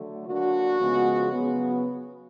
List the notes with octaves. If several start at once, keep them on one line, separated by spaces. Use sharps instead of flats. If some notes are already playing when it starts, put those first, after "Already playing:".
Already playing: D3 F#3 A3
D3 F#3 A#3 D4 F#4
C#3 F3 G#3 B3
C#3 F#3 B3